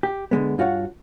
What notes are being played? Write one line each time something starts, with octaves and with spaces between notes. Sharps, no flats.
G4
D3 G#3 B3
G2 F4 F#4 C#5 F5 F#5